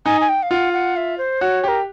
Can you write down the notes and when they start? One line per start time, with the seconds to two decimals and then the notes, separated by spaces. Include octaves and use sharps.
0.06 D#4 G#5
0.21 G#5
0.29 G5
0.43 F5
0.50 F4 F#5
0.73 F#5
0.96 E5
1.18 C5
1.41 F#4 C#5
1.64 G4 A#4